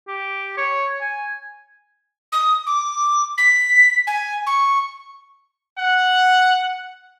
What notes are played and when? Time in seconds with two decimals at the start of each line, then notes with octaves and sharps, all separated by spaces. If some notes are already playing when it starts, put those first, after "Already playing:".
0.08 G4
0.57 C#5
1.01 G#5
2.32 D#6
2.66 D6
3.37 B6
4.07 G#5
4.46 C#6
5.78 F#5